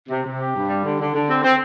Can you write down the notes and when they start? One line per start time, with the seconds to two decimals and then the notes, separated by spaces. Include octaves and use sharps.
0.09 C3
0.24 C3
0.39 G4
0.54 G2
0.68 G3
0.83 D3
0.99 D3
1.14 D3
1.29 C4
1.43 C4